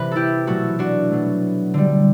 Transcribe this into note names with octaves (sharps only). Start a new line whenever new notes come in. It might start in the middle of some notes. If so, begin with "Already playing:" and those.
Already playing: C3 E3 B4
E4 G4 A4
B2 F#3 A3 F#4 A4
D4 F#4
B2 F#3 A3
D3 G3